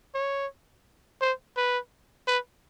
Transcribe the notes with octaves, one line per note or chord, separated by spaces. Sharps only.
C#5
C5
B4
B4